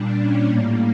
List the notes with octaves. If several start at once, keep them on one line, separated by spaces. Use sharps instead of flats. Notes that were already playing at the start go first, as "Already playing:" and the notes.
Already playing: A#2 G3 D4
C#4
A2 G3 A#3